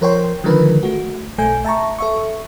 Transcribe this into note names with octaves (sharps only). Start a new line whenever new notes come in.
F3 A#4 C5 C#5 G5 C6
D3 D#3 F3 G#3 A#4 B4
A3 F#4
B1 A3 G#5 G6
E5 A5 A#5 C#6
A4 E5 C#6